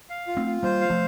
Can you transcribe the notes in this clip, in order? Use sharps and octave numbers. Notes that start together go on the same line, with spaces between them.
F5
F4
A3 C4
F4
G3 A#3 C5
F5
F3 A3